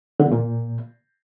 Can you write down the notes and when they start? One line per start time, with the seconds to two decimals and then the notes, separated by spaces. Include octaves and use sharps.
0.20 D3
0.26 E2
0.32 A#2